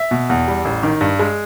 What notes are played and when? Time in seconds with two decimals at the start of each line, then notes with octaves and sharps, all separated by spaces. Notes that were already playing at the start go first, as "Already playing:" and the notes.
Already playing: E5
0.11 B2
0.29 E2
0.48 G3
0.65 A1
0.83 D#3
1.01 G2
1.19 G#3